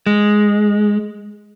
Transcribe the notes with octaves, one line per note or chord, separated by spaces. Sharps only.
G#3